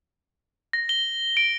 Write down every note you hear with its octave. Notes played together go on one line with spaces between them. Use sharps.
A#6
G7
D7